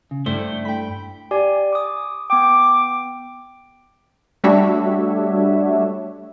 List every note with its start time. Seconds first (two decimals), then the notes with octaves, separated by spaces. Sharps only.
0.11 C#3
0.26 G2 A3 E4 C5
0.65 G5 B5
1.31 G4 D5 G#5
1.73 D6 D#6
2.30 B3 G5 D6
4.44 G3 A3 D4 F#4 C#5 E5